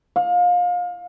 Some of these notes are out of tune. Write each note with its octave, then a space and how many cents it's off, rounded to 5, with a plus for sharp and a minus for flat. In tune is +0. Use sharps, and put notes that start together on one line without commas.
F5 +30